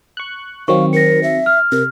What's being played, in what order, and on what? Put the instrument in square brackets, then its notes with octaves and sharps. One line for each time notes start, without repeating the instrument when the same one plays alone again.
[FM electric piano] C#6 F#6
[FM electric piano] D#3 F#3 C4 [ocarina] F5 [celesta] C#6
[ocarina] A#4 [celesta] A#6 C#7
[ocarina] E5
[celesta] F6
[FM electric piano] C3 [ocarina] A#4